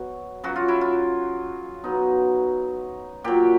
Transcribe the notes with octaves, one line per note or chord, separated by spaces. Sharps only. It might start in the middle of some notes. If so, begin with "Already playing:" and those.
Already playing: B2 F#3
C#3 F#3 F#4
F4
E4
F4
B2 F#3 D#4
A#2 F#3 G4